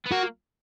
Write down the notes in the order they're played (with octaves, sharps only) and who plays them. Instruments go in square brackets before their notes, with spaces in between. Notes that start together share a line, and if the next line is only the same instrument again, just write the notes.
[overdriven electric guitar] B3
[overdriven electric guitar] A#3 [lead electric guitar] F#4